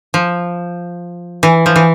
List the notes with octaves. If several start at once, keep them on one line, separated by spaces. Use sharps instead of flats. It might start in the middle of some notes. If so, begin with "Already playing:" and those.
F3
E3
F3
E3